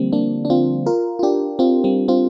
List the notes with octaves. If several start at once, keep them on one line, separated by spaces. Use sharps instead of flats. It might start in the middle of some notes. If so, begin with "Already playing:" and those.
Already playing: D3 F3 G3 A#3 C4
A#3 D4
D4
C4 F4
F4 A#4
F4
D4 G4
C4 F4
G3 C4
C4 F4